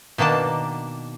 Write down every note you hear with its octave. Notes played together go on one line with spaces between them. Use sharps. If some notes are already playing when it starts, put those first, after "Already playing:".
B2 D#3 A#3 D4 A5